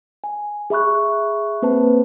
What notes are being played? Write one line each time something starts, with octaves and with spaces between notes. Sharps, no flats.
G#5
G#4 E5 B5 C#6 F#6
A#3 C4 B4 C5 A5